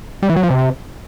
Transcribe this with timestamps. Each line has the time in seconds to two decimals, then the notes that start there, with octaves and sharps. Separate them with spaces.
0.23 G3
0.29 E3
0.36 F#3
0.43 F3
0.50 C3